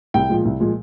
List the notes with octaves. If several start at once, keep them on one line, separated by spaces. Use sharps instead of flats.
C2 G5
A#2 F3 G#3
C2
A#2 F3 G#3